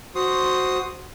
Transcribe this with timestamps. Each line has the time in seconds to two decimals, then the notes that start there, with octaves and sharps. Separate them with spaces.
0.15 F#4 C5 C6 D#6